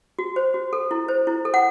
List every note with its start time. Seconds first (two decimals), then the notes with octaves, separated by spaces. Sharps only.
0.19 F#4
0.36 C5
0.54 F#4
0.73 A4
0.91 E4
1.08 C5
1.27 E4
1.45 A4
1.54 F#5